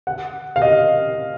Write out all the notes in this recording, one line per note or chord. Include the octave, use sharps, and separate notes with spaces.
F#5
F5
D#5